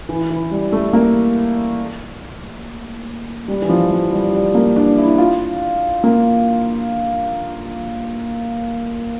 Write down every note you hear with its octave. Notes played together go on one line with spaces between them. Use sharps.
E3
E3
G3
A3
A#3
G3
E3
F3
F3
G3
G3
A#3
D4
E4
F4
A#3